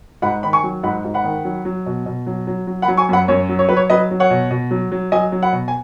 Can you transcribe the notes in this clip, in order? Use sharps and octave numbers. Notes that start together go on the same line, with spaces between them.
G#2 F#5 B5
D#3 B5
G#5 C#6
F#3
G#2 F#5 B5
G#2
F#5 B5
D#3
F#3
F#3
B2
B2
F#3
F#3
F#3
F#5 B5
F#3
G#5 C#6
F#2 F#5 B5
F#2 C#5
F#3
C#5
F#3 B4
C#5
F#3 B4 D#5
F#3
C#5 F#5
B2
B2
F#3
F#3
F#3 D#5 G#5
F#3
F#5 B5
B2
G#5